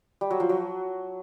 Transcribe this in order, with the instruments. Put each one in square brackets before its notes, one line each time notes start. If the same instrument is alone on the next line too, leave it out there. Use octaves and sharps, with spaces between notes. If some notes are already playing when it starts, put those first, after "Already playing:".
[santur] G3
F#3
F3
F#3